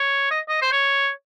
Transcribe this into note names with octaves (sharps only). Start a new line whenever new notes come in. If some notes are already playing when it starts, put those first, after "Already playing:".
Already playing: C#5
D#5
D#5
C5
C#5